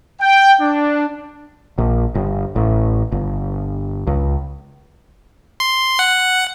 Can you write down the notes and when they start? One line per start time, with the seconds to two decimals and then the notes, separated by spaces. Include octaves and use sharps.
0.21 G5
0.61 D4
1.78 A#1
2.15 G1
2.56 A1
3.12 G1
4.07 C#2
5.60 C6
5.99 F#5